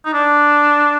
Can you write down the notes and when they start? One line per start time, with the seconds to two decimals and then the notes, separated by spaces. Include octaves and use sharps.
0.06 D#4
0.14 D4